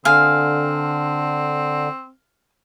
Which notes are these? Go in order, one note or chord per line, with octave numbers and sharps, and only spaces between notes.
D3 C4 F5 G#5